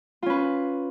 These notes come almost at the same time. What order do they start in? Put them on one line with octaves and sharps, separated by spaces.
F4 C#4 B4